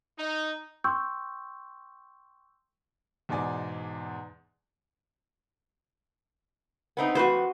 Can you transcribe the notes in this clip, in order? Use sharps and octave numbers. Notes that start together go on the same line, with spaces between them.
D#4
G5 C6 C#6 E6 G6
E2 G#2 B2 D5 G#5
B3 C4 D#4
F2 F#4 B4 C5